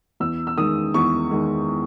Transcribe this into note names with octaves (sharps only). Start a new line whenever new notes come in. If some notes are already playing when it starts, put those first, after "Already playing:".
E2 E6
E6
D#3 G#3 D#6
E2 C#6
D#3 G#3